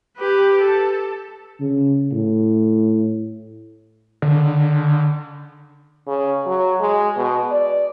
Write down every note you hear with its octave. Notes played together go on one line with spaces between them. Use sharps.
G4 B4
A4
C#3
A2
D3
C#3
F#3
G#3
B2
D5